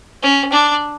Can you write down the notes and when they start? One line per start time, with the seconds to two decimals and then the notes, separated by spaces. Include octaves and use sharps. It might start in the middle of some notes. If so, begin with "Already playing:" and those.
0.23 C#4
0.52 D4